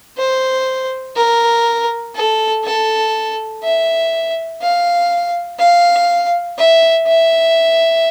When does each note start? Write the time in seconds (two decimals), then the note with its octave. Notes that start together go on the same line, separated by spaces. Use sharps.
0.18 C5
1.16 A#4
2.15 A4
2.64 A4
3.63 E5
4.62 F5
5.59 F5
6.58 E5
7.07 E5